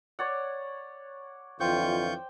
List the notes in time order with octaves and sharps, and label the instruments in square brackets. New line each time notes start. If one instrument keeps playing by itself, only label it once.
[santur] C#5 D5 F#5
[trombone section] F2 D3 E3 [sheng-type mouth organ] F4 C#6 G6 [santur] C5 G5